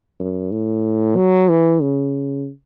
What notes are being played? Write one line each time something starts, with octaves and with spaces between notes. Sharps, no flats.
F#2
A2
F#3
E3
C#3